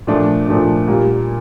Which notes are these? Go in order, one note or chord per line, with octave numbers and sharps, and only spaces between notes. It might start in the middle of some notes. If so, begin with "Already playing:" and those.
A#2 F3 A3 D4
A#2 F3 A3 D4
A#2 G3 A#3